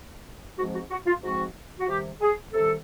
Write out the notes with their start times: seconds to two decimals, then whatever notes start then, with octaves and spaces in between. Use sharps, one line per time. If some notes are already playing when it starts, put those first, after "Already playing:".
0.58 G#2 F3 G#3 C4 F#4
0.73 F#4
0.90 F#4
1.07 F4
1.23 G#2 F3 G#3 C4 F#4
1.80 F#4
1.87 C3 D#3 G3 G4
2.21 G#4
2.53 C3 D#3 G3 A4